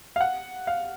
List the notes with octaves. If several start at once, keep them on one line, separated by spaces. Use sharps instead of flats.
F5
F#5
F5